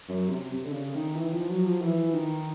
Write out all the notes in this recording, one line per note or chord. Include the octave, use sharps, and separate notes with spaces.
F#2
C3
C3
D3
C#3
D#3
E3
F3
F#3
F3
E3
D#3